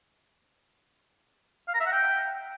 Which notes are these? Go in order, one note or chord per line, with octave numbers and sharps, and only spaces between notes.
F5
A#5
E5
F#5
G5